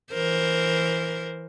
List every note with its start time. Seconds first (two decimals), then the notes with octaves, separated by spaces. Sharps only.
0.13 E3 A#4 C5